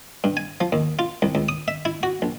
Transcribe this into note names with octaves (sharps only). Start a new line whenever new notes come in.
G2
G#5
F3
D#2
F4
C2
C#2
D#6
E5
E4
F#4
A#1